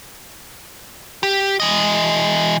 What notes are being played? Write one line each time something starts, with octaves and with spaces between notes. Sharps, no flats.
G4
E3 D#5